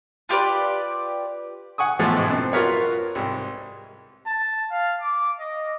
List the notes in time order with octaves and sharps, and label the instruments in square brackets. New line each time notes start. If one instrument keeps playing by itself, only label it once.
[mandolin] F4 G4 B4 D5
[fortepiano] F#5 G#5 C#6 D#6
A2 E3 F3 G#3 A3 B3
G#2 B2 G#3
F#2 C4
F4 F#4 A#4 B4 C#5
C2 G#2
[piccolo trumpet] A5
F5
D6
D#5